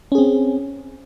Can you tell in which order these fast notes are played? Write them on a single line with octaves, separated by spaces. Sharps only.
C#4 G#4 C4